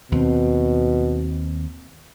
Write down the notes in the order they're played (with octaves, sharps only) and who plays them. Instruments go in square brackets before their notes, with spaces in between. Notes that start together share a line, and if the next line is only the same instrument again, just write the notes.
[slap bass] D#2 C4 [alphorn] B2